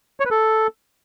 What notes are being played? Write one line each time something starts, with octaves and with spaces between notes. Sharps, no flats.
C#5
B4
A4